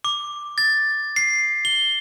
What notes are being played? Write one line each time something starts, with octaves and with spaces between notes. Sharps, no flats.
D6
A6
C7
G7